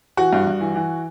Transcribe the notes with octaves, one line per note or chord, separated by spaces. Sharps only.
E3 F#4
G2
G2
E3
E3